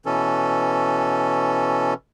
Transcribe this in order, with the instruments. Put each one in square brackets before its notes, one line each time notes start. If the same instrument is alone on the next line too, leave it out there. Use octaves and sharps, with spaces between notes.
[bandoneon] B2 E3 C#4 A4